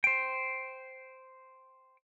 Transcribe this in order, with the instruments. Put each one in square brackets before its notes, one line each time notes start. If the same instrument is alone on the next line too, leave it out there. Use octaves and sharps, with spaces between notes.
[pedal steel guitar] C5 G5